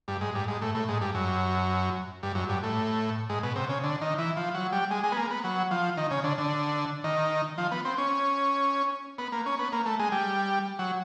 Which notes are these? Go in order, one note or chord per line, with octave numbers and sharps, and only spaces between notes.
G2
G#2
G2
G#2
A2
A2
G#2
G2
F#2
G2
F#2
G2
A2
G#2
B2
C3
C#3
D3
D#3
E3
F3
F#3
G3
G#3
G#3
B3
A#3
B3
F#3
F3
D#3
C#3
D3
D3
D#3
F3
B3
C4
C#4
B3
A#3
C#4
B3
A#3
A3
G#3
G3
F#3